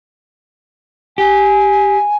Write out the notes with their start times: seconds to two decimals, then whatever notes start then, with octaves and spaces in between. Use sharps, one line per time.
1.18 G4 G#5